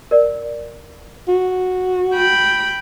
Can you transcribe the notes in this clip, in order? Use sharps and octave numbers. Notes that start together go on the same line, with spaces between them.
A#4 D5
F#4
G5 B5